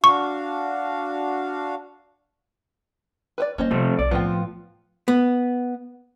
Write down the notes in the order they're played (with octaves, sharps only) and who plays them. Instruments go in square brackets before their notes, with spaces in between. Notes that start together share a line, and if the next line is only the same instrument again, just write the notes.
[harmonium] D4 F#4 F5 [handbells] C#6
[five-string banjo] B4 C5 D5
[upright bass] G3 A#3 [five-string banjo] C#4 C5 D#5
[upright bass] C3 [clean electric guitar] F3 A3 C4
[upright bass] B1 [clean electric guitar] D5
[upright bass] A2 [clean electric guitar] F3 [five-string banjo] B3 C4 G5
[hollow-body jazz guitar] B3